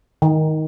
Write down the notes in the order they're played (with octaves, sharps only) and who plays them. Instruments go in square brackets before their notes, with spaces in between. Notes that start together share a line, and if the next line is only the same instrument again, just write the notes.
[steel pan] D#3